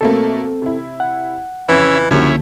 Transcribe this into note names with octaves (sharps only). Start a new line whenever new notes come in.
B2 A3 A#3 C4 A4
C3 E4
F#5
F2 C#3 E3 C#4 E5
C#2 F#2 D3 F3 A#3 C#4 E4 G4